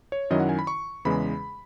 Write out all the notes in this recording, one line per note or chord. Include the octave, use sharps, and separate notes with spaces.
C#5
F#2 D#3 F#3 C#4 E4 D#5
F#5
G#5
B5
C#6
E2 C#3 E3 G#3 B5